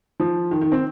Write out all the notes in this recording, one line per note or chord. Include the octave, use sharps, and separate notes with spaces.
F3
D#3
D#3
C4